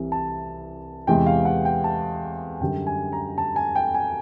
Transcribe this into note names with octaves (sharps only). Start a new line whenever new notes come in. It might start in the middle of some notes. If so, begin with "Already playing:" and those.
Already playing: C2 C3 E3
A5
E2 C3 E3 G#3 G5
F5
F#5
G5
A5
F#2 D3 G3 G5
G#5
A#5
A5
G#5
G5
G#5